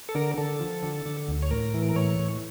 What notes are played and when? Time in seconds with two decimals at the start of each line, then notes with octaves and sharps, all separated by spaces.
0.09 A4
0.15 D3 A#4
0.38 D3 A4
0.60 F3
0.83 D3
1.06 D3
1.28 D2
1.42 C#5
1.51 A2 A#4
1.74 E3
1.89 A#4
1.96 A2 C#5
2.19 A2